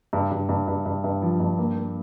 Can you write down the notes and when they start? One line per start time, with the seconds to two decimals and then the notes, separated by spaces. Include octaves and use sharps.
0.13 G2
0.31 G2
0.49 G2
0.68 G2
0.86 G2
1.04 G2
1.22 F3
1.40 G2
1.58 A#3
1.77 A#3